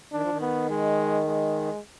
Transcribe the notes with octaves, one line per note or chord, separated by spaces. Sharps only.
D#3 D4
F3
D#3
B3
G#3
G#3